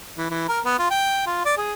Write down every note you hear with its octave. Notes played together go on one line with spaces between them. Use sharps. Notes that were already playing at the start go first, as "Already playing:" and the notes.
E3
E3
A#4
B3
F4
G5
F4
D5
G#4